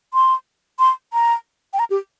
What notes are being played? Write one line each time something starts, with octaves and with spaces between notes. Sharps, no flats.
C6
C6
A#5
G5
A#5
G4